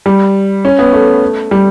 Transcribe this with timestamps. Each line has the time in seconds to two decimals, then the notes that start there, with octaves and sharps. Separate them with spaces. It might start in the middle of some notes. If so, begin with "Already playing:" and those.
0.06 G3
0.65 C#4
0.79 B3
0.93 A3
1.51 G3